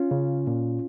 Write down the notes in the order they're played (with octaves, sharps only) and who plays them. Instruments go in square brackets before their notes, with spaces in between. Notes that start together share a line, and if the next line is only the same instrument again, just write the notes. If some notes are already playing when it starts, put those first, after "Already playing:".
Already playing: [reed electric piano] C#4 F4
C#3
A#2